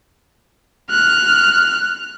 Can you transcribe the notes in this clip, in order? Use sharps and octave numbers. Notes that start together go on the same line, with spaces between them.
F6 F#6